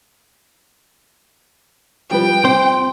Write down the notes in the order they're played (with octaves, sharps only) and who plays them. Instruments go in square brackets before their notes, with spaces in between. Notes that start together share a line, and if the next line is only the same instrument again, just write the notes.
[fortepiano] F3 G3 B4 [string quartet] G5
[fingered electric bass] C4 [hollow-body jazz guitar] C5